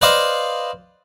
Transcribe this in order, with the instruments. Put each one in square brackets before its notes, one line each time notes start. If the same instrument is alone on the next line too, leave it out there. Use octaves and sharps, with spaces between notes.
[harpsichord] B4 C5 D5 D#5 F5